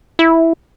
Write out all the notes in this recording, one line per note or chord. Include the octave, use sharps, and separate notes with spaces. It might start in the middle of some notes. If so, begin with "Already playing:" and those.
E4